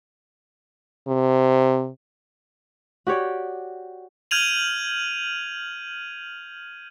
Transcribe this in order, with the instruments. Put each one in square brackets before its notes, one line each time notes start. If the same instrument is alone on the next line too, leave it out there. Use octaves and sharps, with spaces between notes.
[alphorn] C3
[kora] F#4 G4 C#5 D5
[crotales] F6 G6 G#6 D#7 F7 F#7